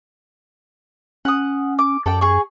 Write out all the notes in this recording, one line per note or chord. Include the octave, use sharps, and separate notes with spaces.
C#4 F#5 D#6
D6
F#2 A4 D5 G5
G#4 C#6